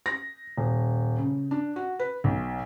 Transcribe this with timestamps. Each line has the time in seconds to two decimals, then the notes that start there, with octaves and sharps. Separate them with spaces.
0.06 A#6
0.58 D#1
1.18 C#3
1.51 D4
1.76 F#4
1.99 B4
2.24 B1